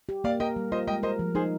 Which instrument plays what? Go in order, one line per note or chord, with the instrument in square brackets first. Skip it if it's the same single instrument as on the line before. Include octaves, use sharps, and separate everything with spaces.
[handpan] G4
[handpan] A#3 [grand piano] D5 F5
[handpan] A#4 [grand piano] D#5 G5
[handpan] G3
[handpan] F4 [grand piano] C5 D#5
[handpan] G#3 [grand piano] D#5 G5
[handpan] A#4 [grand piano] C5 D#5
[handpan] F3
[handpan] D#4 [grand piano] G#4 C5